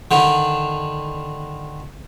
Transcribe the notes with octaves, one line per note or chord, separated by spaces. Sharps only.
D3 D#3